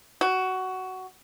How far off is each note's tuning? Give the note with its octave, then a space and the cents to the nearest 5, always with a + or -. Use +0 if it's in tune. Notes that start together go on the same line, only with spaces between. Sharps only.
F#4 +15